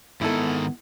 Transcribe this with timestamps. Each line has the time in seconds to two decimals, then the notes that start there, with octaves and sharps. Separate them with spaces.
0.21 G#2 D#3 B3 E4 A4